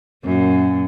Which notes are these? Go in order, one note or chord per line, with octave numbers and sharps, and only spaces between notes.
F#2 A#2